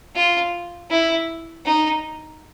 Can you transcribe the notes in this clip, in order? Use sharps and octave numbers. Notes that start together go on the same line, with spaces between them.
F4
E4
D#4